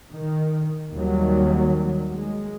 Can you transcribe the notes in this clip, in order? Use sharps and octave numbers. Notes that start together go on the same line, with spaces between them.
D#3
D#2 D#3 F#3 G3
G#3